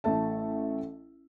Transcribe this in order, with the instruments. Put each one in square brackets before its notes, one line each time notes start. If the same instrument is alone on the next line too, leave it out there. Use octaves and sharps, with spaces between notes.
[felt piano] A1 A3 A4 E5 A5